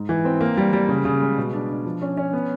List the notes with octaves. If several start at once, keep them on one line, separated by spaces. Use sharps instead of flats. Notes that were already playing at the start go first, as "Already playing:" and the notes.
Already playing: G#2
E3
C4
A#3
G3
G3
C#3
C#3
G#3
B2
D4
D4
F3
C#4
C#4
B3